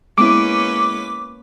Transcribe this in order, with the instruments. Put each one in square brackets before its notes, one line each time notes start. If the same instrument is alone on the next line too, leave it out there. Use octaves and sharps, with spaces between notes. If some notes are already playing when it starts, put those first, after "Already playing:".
[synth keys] G#3 B3 E4 [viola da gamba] A#3 C#4 B4 [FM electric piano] D6